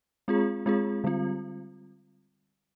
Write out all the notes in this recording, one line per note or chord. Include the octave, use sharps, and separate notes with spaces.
G#3 C4 F4 G#4
G#3 C4 F4 G#4
D3 G3 C4 F4